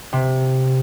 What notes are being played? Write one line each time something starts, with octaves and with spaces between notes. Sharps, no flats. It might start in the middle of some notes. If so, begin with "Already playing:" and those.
C3